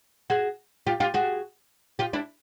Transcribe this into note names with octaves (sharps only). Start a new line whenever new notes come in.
F#4 G#4
F4 G4
F4 G4
F#4 G#4
F4 G4
D4 E4